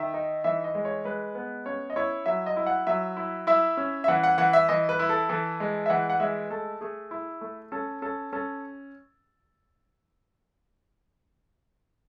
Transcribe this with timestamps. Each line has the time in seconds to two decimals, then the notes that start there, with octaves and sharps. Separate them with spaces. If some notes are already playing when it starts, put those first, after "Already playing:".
Already playing: D#3 E5
0.14 D#4
0.44 E3 E5
0.64 D#5
0.75 G#3
0.85 C#5
1.05 G#3 B4
1.35 B3
1.66 C#4 C#5
1.90 D#5
1.96 E4 C#5
2.26 F#3 E5
2.46 D#5
2.56 E4
2.66 F#5
2.87 F#3 E5
3.17 E4
3.47 E4 E5
3.77 C#4
4.04 E5
4.08 E3 F#5
4.23 F#5
4.38 E3 F#5
4.53 E5
4.69 E3 D#5
4.89 B4
4.99 E4
5.09 A4
5.29 E3 A4
5.60 G#3
5.86 E5
5.90 E3 F#5
6.10 F#5
6.20 G#3 E5
6.50 A3 A4
6.81 A3 G#4
7.11 E4
7.41 A3
7.72 C#4 A4
8.02 C#4 A4
8.33 C#4 A4